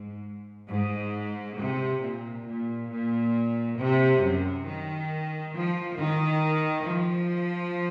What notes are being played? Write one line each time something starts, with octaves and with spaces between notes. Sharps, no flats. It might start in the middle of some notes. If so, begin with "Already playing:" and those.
Already playing: G#2
G#2
C3
A#2
A#2
A#2
C3
F#2
D#3
F3
D#3
F3